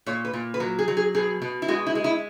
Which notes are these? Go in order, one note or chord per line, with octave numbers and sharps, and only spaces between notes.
A#2 C#5
B4
A#2
B4
F#3 A#4
G#4
F#3
G#4
B2 G#4
B2
E4
G#3 F#4
E4
G#3
E4